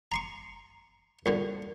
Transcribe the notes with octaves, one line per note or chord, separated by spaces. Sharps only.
A#5 C6 C#6
C2 A#2 D3